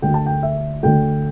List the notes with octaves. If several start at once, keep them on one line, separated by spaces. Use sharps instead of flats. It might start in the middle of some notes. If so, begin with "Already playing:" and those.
D2 D3 A3 G5
A5
G5
E5
D2 D3 A3 G5